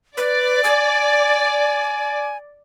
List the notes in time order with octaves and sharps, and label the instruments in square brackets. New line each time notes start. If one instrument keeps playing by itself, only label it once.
[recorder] B4 [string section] D5
[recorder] G#5